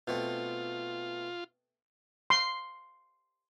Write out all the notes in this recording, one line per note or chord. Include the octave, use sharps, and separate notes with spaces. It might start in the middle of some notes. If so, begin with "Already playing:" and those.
B2 A3 C4 F4
C6